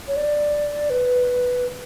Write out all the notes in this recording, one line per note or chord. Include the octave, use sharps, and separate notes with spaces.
C#5
D5
B4